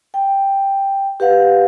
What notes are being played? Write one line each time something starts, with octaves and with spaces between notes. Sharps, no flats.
G5
G4 B4 F5 F#5